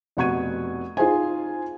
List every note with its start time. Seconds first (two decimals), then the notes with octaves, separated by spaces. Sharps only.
0.17 F1 B2 F#5 C#6 G#6 D#7
0.97 D#4 F4 G#4 C5 G#5